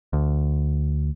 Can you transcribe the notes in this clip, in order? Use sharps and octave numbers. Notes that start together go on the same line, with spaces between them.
D2